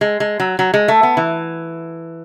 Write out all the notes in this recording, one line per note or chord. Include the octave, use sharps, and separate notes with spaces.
G#3
G#3
F#3
F#3
G#3
A3
B3
E3